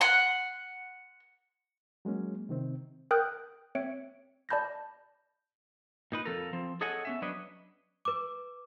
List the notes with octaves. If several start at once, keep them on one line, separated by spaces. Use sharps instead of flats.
F#5 C6
F#3 G#3 A#3 C#4
C3 D#3 C4
A#4 G5 D#6 F#6 G6
C4 C#5 E5 C#7 D7
D5 A5 B5 G6 A6 A#6
A#2 D#4 B4
F2 F3 A4 A#4
F3 C4
G#4 A4 C#5 D#5 F#5 G#5
B3 C#4 E5
F#3 D4 B4 C#5 D#5
B4 D6